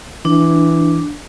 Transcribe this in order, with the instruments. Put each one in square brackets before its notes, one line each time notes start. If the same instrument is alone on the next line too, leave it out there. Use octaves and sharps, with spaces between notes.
[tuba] E3 [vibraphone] D4